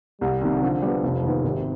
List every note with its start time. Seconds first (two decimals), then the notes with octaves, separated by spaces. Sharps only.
0.21 C2 G3
0.41 C3 D#3
0.62 D3 F3
0.82 G3 B3
1.03 F1
1.23 D#2 D#3 B3
1.44 G#1 C3